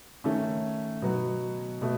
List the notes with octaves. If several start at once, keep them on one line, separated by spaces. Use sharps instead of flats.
D#3 A3 C#4
B2 F#3 B3 F#4
B2 A3